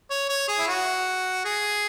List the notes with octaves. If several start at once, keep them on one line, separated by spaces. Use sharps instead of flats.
C#5
C#5
G#4
E4
F#4
G#4